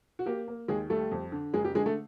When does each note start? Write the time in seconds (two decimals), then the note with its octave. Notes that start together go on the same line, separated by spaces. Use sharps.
0.19 F#4
0.26 A#3 G4
0.48 A#3
0.68 D#2 G#3 G#4
0.90 G3 A3 A4
1.11 F2
1.32 D3
1.53 F#1 G#3 G#4
1.64 G4
1.75 D3 G#3 G#4
1.86 A3 A4